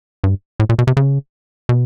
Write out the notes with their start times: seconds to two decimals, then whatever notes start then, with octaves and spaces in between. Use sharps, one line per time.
0.24 G2
0.60 A2
0.69 A#2
0.79 B2
0.87 C3
0.97 C#3
1.69 B2